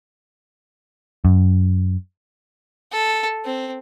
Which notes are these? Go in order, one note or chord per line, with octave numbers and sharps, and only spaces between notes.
F#2
A4
C4